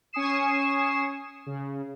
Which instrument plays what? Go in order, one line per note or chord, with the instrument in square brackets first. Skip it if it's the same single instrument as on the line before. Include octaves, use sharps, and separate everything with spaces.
[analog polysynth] C#4 G#5 C#6 D#6 C7 E7
C#3